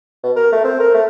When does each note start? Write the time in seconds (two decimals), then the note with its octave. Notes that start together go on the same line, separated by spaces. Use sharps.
0.23 B2
0.36 A#4
0.52 A3
0.64 C4
0.80 A#4
0.94 A3